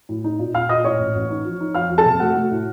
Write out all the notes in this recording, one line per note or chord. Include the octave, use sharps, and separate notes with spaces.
A2
D#4
A#2
A#2 F5 F6
A#2 D#5 D#6
A2 C#5 C#6
A1
A1
D#4
F3
D#4
F2 F5 F6
F2
A4 A5
C3
A3 F#4 F#5
A3
A2